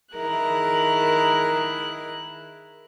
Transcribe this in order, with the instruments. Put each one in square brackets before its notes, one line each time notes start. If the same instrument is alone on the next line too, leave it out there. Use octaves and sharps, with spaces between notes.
[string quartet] D#3 E4 G#4 A#4 F#6